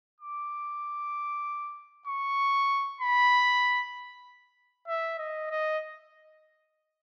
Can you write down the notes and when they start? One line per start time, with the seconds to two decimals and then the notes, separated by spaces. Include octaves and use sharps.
0.21 D6
2.07 C#6
3.01 B5
4.88 E5
5.18 D#5
5.51 D#5